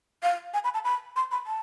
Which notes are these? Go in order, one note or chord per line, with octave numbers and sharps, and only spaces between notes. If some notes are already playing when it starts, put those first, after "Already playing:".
F5
G#5
B5
A5
B5
C6
B5
A5